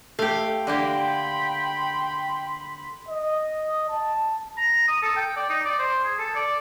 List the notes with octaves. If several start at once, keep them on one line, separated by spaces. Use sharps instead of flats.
A3 G4 F5
D3 A#3 G4 G5 B5 C6
D#5
A5
A#5
D#6
A4
G5
D5
D#4
D5
C5
G#4
A4
D5